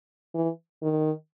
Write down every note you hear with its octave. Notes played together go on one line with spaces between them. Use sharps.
E3
D#3